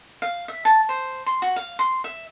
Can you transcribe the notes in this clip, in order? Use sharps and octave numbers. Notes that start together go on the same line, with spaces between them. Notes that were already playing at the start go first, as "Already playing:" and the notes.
F5
E5
A5
C5
C6
F#4
F5
C6
E5